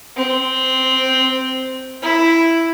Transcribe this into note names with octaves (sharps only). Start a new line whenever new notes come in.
C4
E4